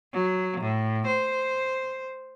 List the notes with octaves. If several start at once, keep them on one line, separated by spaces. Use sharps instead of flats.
F#3
A2
C5